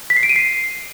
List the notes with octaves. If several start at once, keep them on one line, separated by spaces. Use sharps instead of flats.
B6
C7
D7
D#7
C7